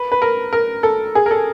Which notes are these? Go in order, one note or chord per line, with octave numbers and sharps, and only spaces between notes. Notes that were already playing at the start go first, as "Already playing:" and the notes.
Already playing: B4
B4
A#4
A#4
A4
G#4
A#4
A4